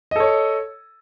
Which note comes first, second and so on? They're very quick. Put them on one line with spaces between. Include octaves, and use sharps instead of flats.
D#5 A4 C#5